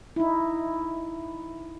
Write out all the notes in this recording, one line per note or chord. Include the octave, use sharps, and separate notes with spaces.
D#4 E4